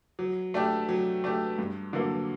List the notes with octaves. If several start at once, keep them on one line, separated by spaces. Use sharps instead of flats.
F#3
A3 D4 G4
F#3
A3 D4 G4
G2
D3 F#3 A#3